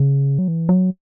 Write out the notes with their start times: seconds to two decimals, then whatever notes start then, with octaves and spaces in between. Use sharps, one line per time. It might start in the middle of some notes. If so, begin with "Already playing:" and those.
Already playing: C#3
0.39 F#3
0.48 E3
0.69 F#3